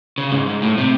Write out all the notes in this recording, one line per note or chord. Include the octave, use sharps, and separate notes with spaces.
C#3
G#2
G#2
A2
C3